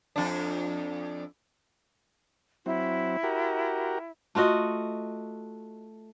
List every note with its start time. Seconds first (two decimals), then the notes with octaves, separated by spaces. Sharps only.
0.16 F2 D4
2.66 F#3 C4 E4
3.23 F#4 G4 A#4
4.35 A3 F4 F#4 D#5